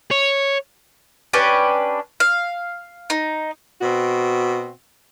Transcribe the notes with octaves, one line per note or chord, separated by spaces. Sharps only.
C#5
C#4 D4 G4 B4
F5
D#4
B2 C4 F#4